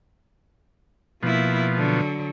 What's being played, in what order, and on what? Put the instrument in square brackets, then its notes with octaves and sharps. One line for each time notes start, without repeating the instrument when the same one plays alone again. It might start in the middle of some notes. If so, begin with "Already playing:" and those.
[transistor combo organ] B2 F3 [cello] A#3 E4
[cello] D3 F#3